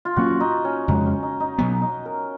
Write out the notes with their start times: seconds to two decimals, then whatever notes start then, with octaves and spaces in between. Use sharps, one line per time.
0.05 F4
0.16 A#2 F#3 A#3 C#4 F#4
0.40 D#4
0.65 C#4
0.88 F2 C#3 G#3 D#4
1.06 C#4
1.23 D#4
1.40 D#4
1.58 B2 F#3 B3 C#4
1.82 D#4
2.06 A#4